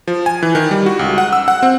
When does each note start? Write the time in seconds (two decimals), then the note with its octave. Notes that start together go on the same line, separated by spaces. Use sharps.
0.07 F3
0.26 G#5
0.43 E3
0.55 D#3
0.71 G3
0.86 F#4
0.99 C#2
1.18 F#5
1.33 E6
1.48 F#5
1.63 C4